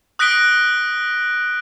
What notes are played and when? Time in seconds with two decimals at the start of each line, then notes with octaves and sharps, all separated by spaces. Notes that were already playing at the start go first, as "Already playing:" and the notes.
0.19 D#6 F#6 A#6 B6 D7 G7